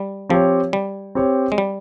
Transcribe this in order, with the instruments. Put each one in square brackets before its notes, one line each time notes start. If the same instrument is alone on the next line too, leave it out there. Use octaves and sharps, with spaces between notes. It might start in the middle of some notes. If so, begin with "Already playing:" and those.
Already playing: [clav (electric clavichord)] G3
[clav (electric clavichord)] F3 [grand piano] C4 G4 C#5
[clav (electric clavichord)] G3
[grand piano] C4 G4 C#5
[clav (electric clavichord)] G#3
G3